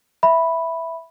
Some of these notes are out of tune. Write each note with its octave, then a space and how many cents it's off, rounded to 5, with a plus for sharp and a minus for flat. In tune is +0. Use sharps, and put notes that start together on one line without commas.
E5 +0 B5 +0